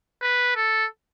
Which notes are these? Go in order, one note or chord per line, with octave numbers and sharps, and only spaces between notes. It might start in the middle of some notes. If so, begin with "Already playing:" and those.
B4
A4